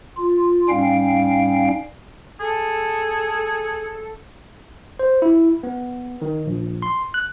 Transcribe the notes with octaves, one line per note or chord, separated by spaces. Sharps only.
F4
G#2 G3 C#4 F5 G5
G#4 A4
C5
E4
B3
D#3
A#1
C6
F#6